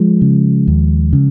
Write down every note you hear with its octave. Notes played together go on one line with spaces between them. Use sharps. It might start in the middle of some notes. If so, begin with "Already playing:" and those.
Already playing: F3 G#3
C#3
D#2
C#3